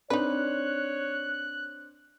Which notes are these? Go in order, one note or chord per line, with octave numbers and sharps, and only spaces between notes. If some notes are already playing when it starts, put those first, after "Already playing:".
C4 D4 D#4 B4 C#5 F#6